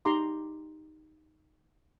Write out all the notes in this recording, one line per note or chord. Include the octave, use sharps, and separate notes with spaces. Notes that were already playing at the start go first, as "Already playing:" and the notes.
D#4 G4 A#5 C6 D6